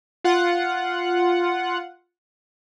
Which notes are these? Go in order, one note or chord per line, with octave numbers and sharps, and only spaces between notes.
F4 F#5